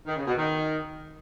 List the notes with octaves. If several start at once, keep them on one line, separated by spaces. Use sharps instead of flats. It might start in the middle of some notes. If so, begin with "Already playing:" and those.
D#3
C#3
B2
D#3